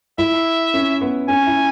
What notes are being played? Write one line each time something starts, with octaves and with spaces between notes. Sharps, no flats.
E4 E5
C#4
B3
C#4 G#5
E4